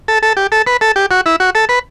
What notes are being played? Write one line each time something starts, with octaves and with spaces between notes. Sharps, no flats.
A4
A4
G4
A4
B4
A4
G4
F#4
E4
F#4
A4
B4